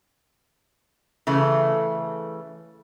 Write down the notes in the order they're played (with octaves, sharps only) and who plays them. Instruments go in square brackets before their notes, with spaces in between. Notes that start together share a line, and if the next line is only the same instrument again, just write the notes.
[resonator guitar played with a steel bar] C#3 E3 A3